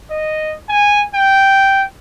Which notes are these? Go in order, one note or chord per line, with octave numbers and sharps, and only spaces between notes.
D#5
G#5
G5